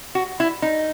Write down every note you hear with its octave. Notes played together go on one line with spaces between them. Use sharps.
F#4
E4
D#4